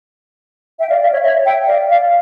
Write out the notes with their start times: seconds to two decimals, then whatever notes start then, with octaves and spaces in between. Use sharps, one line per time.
0.79 E5 G5
0.90 D5 F5
1.01 D5 F5
1.12 C#5 E5
1.23 C#5 E5
1.45 E5 G5
1.66 D5 F5
1.88 D5 F5